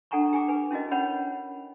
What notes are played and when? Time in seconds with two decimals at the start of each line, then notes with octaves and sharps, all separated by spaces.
0.11 D4 A4 F#5 G#5 A#5 C#6
0.33 G4 G#5 D6
0.48 B4 G#5
0.71 C#4 E4 F#4 A#4 D#5
0.91 C#4 A#4 C#5 F#5 B5